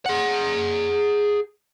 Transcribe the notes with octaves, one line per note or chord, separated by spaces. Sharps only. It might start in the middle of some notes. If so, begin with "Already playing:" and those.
G#4 F#5